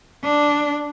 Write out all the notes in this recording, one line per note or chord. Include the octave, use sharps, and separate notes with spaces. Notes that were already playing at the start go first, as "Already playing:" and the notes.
D4